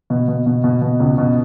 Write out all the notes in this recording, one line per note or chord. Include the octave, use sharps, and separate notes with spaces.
B2
B2
B2
B2
B2
C#2
B2